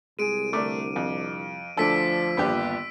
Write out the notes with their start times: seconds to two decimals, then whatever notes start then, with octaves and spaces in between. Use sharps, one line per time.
0.19 C2 G#3 G#4 D7 D#7
0.53 D3 A3 D4 A#4 D6
0.96 F2
1.77 D2 F3 D4 A4 E6 B6 D7
2.37 G1 D#2 B3 D4 F4 G4